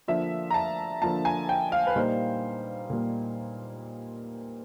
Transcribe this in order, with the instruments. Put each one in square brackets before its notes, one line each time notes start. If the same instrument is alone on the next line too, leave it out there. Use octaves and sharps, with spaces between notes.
[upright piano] D3 F3 A#3 D4 F4 E5
A#5
A5
D3 F3 A#3 D4 F4 A5
G#5
G5
F5
B4
A#2 G3 A#3 D#4 C5
A#2 G3 A#3